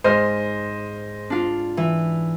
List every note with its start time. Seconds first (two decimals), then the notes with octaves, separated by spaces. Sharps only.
0.04 G#2 C5 D#5 F6
1.30 D4 F4
1.77 E3